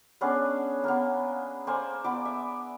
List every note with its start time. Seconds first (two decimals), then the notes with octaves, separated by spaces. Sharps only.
0.21 B3 C#4 D4 G#4
0.84 A#3 B3
1.67 A#3 C5 D5 G#5
2.04 B3 D5 D6
2.25 E5